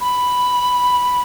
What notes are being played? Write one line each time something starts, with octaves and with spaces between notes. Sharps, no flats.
B5